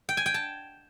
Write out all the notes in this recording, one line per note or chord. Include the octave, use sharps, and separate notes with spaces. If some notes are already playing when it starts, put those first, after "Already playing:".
G5
G#5
G5
A5